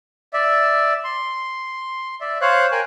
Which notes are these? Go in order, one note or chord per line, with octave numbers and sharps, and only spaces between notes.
D5 E5
C6
D5 E5
C5 C#5 F5 F#6
A#4 G5 G#5 F#6